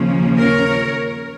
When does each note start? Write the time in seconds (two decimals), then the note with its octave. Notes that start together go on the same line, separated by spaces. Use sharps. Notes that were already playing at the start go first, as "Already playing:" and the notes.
Already playing: D#2 C#3 F3 A#3 C#4
0.39 A#4 C#5